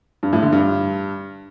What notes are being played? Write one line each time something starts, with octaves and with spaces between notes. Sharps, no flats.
G2
A2
D3
G2